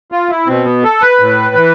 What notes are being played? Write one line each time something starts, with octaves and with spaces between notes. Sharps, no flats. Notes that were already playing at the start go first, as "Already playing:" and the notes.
F4
E4
B2 C4
B3
A4
B4
A2
E3